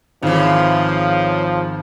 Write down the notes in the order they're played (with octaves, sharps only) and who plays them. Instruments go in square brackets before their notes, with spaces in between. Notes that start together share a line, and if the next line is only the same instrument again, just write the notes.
[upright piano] G#1 [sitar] C#3 E3 [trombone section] F3 [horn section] F5